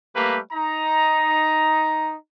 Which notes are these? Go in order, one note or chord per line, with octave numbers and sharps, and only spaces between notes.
G3 A3 A#3 G4 B4
D#4 A#5